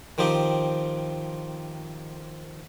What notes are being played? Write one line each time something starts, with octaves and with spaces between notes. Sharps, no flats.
D#3 F3 C4 G4